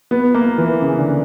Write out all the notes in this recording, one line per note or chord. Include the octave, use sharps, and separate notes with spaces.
B3
A#3
E3
C#3
D3